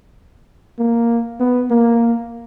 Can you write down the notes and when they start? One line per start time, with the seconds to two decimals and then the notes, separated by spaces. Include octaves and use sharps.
0.79 A#3
1.40 B3
1.71 A#3